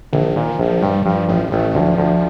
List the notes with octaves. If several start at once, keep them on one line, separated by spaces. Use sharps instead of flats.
A#1 D3
D#3
A#2
F3
A#1
G2 G3
G2 F3
A1 F3
A1 A3
D2 F3
D2